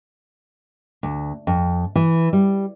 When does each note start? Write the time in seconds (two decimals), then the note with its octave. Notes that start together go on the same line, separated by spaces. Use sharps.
1.03 D2
1.47 F2
1.96 E3
2.33 G3